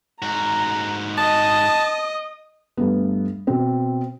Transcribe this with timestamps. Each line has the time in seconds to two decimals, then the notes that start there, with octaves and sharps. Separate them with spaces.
0.22 G#2 F#4 A#5
1.18 D#5 A5 D#6
2.77 G2 A3 B3
3.47 B2 C4